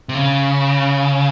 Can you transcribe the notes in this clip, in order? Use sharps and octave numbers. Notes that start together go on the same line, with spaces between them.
C3
C#3